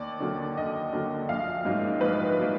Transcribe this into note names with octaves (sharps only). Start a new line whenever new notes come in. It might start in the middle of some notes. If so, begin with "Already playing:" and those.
Already playing: D#2 D5
D3 F#3 A#3
D#2 D#5
D3 F#3 A#3
A#1 F5
G#2 F#3 A#3
A#1 B4
F#3 A#3